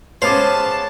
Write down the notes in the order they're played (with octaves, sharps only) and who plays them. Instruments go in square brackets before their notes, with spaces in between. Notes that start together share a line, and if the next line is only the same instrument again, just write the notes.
[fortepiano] G#3 B3 C#4 [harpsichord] C5 F5 [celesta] C#5 D6 [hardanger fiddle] A5